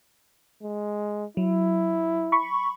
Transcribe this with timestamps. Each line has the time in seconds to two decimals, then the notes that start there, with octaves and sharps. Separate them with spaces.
0.63 G#3
1.37 F#3 E4
2.32 B5 C#6